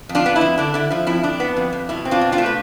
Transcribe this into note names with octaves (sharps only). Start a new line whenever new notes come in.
F2
D4 F4
B3
E4
F2
D3 D4
D3 E4
F3 E4
F2 E4
F2 D4
B3
F2
F2
B2 E4
C4
D4 F4
B2
D4 F4
A3
B4